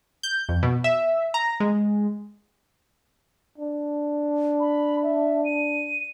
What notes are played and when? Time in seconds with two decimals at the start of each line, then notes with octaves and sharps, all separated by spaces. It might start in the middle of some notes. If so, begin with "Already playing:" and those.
0.23 G6
0.49 F2
0.63 B2
0.84 E5
1.34 A#5
1.60 G#3
3.58 D4
4.60 B5
5.03 E5
5.45 D#7